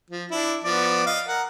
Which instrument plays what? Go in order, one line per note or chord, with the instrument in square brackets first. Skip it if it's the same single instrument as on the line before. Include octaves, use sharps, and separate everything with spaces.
[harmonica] F3
D4 E4
F3 B3 D5
D#5 F5
A#4 F#5